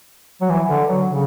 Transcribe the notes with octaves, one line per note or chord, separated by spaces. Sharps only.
F#3
E3
D3
F#3
C#3